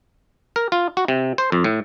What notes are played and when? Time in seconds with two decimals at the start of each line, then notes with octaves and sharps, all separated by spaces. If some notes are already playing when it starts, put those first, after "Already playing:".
0.56 A#4
0.72 F4
0.97 F#4
1.08 C3
1.38 C5
1.52 F2
1.64 A2